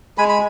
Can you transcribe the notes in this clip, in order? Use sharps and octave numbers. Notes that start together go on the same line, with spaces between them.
G#3 G#5 B5
B5